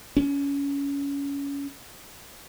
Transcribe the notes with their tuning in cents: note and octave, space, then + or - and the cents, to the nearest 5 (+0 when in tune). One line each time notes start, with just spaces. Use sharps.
C#4 +25